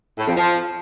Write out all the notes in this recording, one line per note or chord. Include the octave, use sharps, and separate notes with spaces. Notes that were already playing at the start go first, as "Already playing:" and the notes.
A2
F2
F3